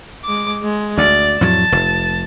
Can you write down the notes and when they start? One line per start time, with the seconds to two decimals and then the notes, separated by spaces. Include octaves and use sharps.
0.24 G#3 D6
0.63 G#3
0.98 D2 D5
1.41 F2 A2 F#3 A5
1.72 F1